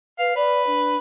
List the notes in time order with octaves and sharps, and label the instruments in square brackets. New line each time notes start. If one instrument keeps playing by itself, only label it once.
[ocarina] B4 [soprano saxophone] F5
[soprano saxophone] B4 [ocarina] D5
[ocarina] D4